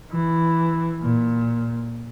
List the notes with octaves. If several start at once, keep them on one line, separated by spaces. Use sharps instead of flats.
E3
A#2